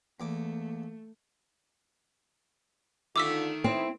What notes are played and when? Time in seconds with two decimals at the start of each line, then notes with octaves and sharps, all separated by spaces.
0.20 E2 A3 A#3 D6
3.16 D3 D#3 A3 F4 D6 E6 B6
3.64 C4 E4